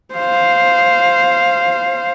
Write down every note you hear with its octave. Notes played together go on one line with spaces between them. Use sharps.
C5 F5